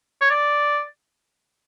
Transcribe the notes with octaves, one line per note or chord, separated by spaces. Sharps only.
C#5
D5